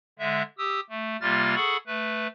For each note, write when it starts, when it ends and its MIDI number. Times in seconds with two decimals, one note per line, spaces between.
0.19 0.42 50
0.19 0.42 56
0.19 0.42 76
0.58 0.80 67
0.58 0.80 87
0.58 0.80 88
0.90 1.17 57
1.21 1.55 48
1.21 1.55 55
1.21 1.55 58
1.21 1.55 65
1.21 1.55 89
1.21 1.55 93
1.55 1.77 68
1.55 1.77 69
1.55 1.77 78
1.55 1.77 83
1.55 1.77 85
1.87 2.27 57
1.87 2.27 71